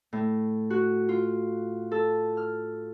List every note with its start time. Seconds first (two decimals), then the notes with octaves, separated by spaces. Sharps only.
0.13 A2
0.70 F#4
1.09 F4
1.91 A4
2.37 F6